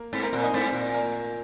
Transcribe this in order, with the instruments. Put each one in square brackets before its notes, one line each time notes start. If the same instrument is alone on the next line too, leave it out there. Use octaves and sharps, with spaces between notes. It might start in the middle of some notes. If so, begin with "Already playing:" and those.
Already playing: [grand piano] A#3 A#4
[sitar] G#2 [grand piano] C4 C5
[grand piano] A#3 A#4
[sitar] A#2 [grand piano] C4 C5
[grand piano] D#4 D#5
[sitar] G#2 [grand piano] C4 C5
[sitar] A#2
[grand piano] A#3 A#4